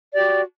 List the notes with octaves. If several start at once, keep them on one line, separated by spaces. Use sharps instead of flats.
F#4 G4 D5